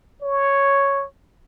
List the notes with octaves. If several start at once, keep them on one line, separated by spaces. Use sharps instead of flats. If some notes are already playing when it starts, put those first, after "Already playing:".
C#5